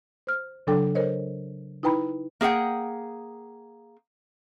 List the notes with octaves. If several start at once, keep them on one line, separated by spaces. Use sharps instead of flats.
C5 F6
C#3 F#3 D4 A4 G5 D6
A#4 C5 C#5 D#5
D#4 E4 B4 G5 A#5 B5
A#3 G#4 E5 F#5 G5